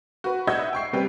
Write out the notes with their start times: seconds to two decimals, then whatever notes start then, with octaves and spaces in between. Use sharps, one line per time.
0.24 F#4 B4
0.47 D#5 E5 F#5 E6 G6 G#6
0.73 G5 C#6 C7
0.93 C3 G3 B4 G5